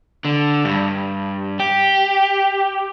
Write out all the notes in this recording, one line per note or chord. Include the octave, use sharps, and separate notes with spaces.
D3
G2
G4